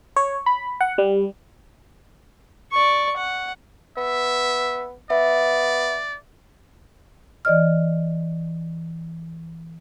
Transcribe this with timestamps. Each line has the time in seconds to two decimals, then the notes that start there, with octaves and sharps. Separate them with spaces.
0.16 C#5
0.46 B5
0.81 F#5
0.98 G3
2.72 D5 C#6
3.17 F#5
3.97 B3 E5
5.10 B3 D5 E5
7.45 E3 D5 D#5 F6